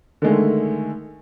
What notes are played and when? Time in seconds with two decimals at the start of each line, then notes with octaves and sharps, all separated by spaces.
0.22 D3 D#3 G#3 A3